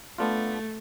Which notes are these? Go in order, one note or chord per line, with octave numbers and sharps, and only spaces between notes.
A3 B3 D4 F4